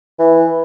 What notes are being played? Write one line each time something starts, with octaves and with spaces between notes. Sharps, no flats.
E3